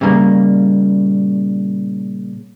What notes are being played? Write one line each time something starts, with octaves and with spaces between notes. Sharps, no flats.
A#2 C#3 G3 A3 A#3